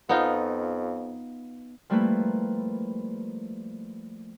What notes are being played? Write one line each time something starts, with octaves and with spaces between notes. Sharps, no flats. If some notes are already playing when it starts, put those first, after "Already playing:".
F2 B3 D#4 F4
F3 G3 A3 A#3 E4 B4